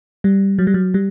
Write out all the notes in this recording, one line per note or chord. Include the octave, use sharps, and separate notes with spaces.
G3
F#3
G3
F#3
G3